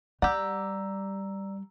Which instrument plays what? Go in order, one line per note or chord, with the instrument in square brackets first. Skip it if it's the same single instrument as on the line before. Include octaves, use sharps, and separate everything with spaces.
[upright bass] G3 [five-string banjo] G4 F#5 [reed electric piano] D5 [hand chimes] A#5 E6